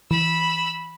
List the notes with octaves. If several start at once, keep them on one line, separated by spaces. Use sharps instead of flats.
E3 B5 E6